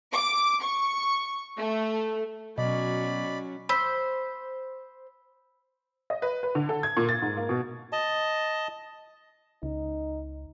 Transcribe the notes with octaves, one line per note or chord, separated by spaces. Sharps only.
D6
C#6
A3
B2 F#3 C#4 D5 D#5 B5
C5 B5 E6 B6
D#5
B4
B4
D3
A4
G#6
A#2
A6
G#2
A#3
B2
D#5 A5
C#2 D#4